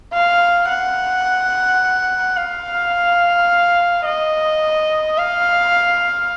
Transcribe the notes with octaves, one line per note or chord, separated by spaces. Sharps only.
F5
F#5
F5
D#5
F5